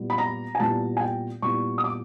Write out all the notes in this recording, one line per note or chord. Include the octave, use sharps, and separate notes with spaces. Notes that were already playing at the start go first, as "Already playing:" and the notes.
Already playing: A#2 G3 B3 E4
B5
A#5
G#5
A#2 G3 B3 E4 A5
G#5
G5
A#2 G3 B3 E4 C#6
D#6
D6